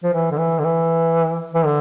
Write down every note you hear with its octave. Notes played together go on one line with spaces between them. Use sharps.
F3
E3
D3
E3
D3
E3
E3
D3